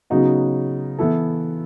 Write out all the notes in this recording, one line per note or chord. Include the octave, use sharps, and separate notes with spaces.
C#3 F#3 B3 D#4 F#4
E3 B3 E4 A4